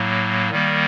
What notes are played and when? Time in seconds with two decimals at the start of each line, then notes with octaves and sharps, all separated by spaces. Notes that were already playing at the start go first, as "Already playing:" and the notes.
Already playing: A2 F#3 A#3
0.50 D#3 G3 A#3